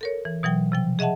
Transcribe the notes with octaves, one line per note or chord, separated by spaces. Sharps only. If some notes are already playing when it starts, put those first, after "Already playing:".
A4 A#4 C#5
E3
B2 E3 F#3 G5
C3 F3 G5
G#4 D#5 E5 F#5 A5